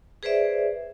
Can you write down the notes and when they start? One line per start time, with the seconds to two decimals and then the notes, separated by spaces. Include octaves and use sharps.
0.23 G#4 B4 C5 D5 E5